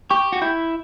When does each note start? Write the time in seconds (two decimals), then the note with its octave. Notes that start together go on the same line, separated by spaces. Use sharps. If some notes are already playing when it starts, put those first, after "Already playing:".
0.10 G4 C#6
0.33 F#4
0.42 E4 G6